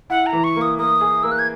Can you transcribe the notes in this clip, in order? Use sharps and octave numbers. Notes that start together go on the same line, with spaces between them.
E4 F#5
A#5
E3
C#6
A#3
D#6
A#3 D#6
G#4
A#3 E6
F#6
G#6